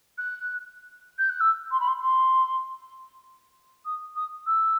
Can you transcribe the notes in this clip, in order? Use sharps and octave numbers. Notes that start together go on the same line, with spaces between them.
F#6
G6
F#6
E6
C6
B5
C6
C6
D#6
D#6
E6